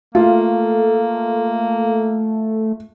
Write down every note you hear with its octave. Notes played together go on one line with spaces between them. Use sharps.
A3 A#3 F4